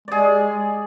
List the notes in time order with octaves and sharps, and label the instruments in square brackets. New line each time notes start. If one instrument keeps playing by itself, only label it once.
[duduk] G#3 [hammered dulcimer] G#4 D5